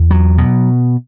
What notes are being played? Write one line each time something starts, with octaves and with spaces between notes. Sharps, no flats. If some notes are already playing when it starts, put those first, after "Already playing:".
Already playing: E2
F#3
B2